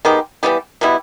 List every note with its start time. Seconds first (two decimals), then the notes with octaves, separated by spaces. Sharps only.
0.05 D#3 G#3 B3 G4
0.43 E3 G3 B3 G4
0.81 B2 G3 B3 E4